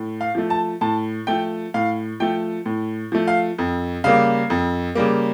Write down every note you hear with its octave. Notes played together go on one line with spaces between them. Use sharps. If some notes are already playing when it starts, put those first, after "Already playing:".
Already playing: A2
F5
F3 A3
A5
A2 A5
F3 A3 G5
A2 F5
F3 A3 G5
A2
F3 A3
F5
F2
C#3 G3 A#3 F5
F2
C#3 G3 A#3